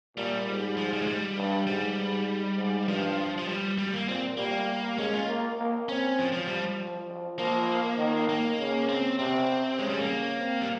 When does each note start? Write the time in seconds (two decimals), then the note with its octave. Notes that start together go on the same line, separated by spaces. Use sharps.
0.17 A#2 G3
0.48 G#2
0.77 F3
0.93 G3
1.02 G#3
1.07 G3
1.37 G2
1.67 G#2 G3
1.98 G#2
2.57 G#2
2.87 G2 F3
3.38 F3
3.48 G3
3.79 G3
3.93 A#3
4.08 A#2 C4
4.37 G3 A#3
4.98 G#3 C#4
5.13 F4
5.28 A#3
5.58 A#3
5.88 C4 C#4
6.18 F3
6.33 F3
6.48 F3 G3
6.78 F3
7.08 F3
7.39 F3 A#3
7.98 D#3
8.29 A#3
8.59 C#3
8.89 C4
9.19 C3 C4
9.79 C#3 G#3
9.89 G3
9.99 A#3
10.39 C4
10.62 G3